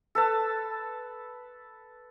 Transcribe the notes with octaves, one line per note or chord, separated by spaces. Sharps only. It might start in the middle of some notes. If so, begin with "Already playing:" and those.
A4 B4 A5